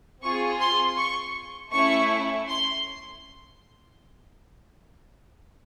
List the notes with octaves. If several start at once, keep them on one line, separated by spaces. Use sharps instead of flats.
C4 F4 G#4 C#6
C6
C#6
A3 C#4 E4 C#6
C6